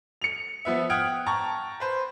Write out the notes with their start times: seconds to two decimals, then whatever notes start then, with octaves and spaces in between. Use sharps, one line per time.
0.22 C#7 F7
0.65 F3 B3 E5
0.90 F#5 G5 D#6 F6 G#6 D7
1.26 G5 A5 A#5 C#6
1.80 B4 C5